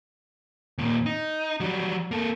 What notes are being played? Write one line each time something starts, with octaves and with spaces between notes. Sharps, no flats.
D#2 A#2
D#4
F#3 G3
A#3 A4